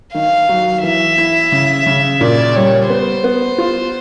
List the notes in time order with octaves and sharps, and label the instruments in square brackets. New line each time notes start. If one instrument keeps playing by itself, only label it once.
[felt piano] D#3 [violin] F5
[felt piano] F#3
[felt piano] E3 [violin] E5
[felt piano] E4
C#3
C#3
[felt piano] A#2 [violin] D5
[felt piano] G3 [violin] C#5
[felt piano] B3 [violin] C5
[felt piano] B3
F4